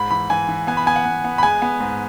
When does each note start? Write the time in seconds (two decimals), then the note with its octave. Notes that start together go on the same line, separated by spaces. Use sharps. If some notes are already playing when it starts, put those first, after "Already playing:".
Already playing: G#2 B5
0.11 E3 B5
0.30 E3 G#5
0.48 E3
0.67 B3 G#5
0.77 B5
0.86 B3 G#5
0.96 F#5
1.05 B3
1.24 B3
1.38 B5
1.42 G#3 G#5
1.62 B3
1.80 G#2